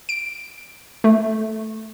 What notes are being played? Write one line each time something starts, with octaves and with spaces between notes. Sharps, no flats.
D7
A3